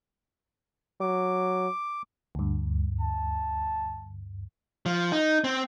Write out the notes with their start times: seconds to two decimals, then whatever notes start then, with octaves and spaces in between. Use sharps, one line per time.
1.01 F#3 D6
2.35 D2 G2
3.01 A5
4.86 F3
5.12 D#4
5.44 C4